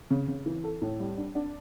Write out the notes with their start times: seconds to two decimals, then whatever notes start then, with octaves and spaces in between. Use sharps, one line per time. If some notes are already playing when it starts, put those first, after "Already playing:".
0.10 C#3
0.28 C#3
0.46 E3
0.64 A4
0.82 A2
1.00 G3
1.18 D4
1.35 D4